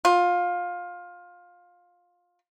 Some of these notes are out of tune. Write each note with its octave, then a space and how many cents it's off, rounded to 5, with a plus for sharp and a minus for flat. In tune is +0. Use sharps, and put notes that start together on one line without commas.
F4 +20